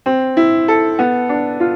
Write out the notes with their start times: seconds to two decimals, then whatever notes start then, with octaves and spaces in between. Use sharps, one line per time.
0.06 C4
0.37 E4
0.68 A4
0.99 B3
1.29 D4
1.60 F4